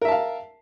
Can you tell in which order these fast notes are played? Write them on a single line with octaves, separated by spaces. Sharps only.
A#4 E5 A5 F5